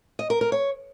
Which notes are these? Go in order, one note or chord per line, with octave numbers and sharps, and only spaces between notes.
D#5
A#4
A#4
C#5